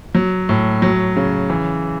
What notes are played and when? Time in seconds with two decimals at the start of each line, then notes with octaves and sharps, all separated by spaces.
0.15 F#3
0.49 A2
0.82 F#3
1.16 C#3
1.50 E3